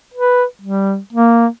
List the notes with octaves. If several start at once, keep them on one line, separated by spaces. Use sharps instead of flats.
B4
G3
A#3